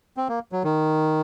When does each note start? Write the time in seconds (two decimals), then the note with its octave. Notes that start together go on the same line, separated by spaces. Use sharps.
0.17 C4
0.29 A#3
0.52 F#3
0.64 D#3